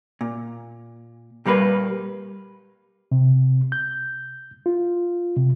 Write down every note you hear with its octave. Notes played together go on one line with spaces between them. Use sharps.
A#2
A#2 G3 A#3 B4
C3
G6
F4
C3